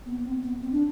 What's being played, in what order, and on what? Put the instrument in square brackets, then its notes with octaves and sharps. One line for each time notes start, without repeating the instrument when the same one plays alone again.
[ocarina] B3
B3
C4
B3
C4
D4